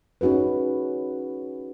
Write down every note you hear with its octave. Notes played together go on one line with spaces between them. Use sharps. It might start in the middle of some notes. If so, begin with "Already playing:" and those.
C#4 D#4 F#4 G#4 B4